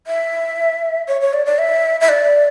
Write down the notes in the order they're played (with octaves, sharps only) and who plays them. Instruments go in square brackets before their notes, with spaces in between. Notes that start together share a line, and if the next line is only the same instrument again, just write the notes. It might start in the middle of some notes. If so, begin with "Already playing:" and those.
[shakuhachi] E5
C#5
C#5
D5
D5
E5
E5
D5